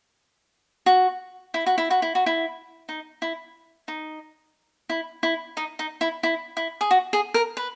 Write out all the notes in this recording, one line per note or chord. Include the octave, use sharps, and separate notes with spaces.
F#4
E4
F#4
E4
F#4
E4
F#4
E4
D#4
E4
D#4
E4
E4
D#4
D#4
E4
E4
E4
G#4
F#4
G#4
A#4
B4